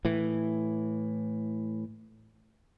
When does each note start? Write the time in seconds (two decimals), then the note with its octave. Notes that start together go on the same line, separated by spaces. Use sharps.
0.05 A2 E3